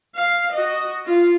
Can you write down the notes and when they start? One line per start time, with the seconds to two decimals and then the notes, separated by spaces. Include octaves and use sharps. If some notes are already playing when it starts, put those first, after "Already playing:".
0.15 F5
0.52 F#4 D#5
1.06 F4